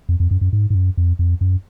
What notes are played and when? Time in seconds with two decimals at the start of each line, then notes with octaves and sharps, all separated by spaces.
0.09 F2
0.20 F2
0.31 F#2
0.41 F#2
0.53 G#2
0.70 G#2
0.75 F#2
0.97 F2
1.19 F2
1.41 F#2